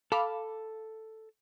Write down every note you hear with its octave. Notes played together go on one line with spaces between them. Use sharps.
A4 F5 B5 D6